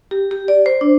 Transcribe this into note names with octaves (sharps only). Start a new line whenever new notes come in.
G4
G4
D5
C5
D4